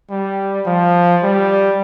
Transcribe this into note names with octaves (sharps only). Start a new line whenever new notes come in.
G3
F3
G3